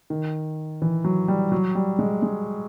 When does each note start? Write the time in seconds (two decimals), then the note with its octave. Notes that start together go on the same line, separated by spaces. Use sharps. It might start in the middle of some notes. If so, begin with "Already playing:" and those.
0.10 D#3
0.82 E3
1.04 F#3
1.28 G3
1.52 F#3
1.75 G3
1.99 G#3
2.22 G#3